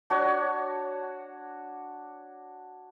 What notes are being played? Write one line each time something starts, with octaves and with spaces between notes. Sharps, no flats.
D4 F#4 C#5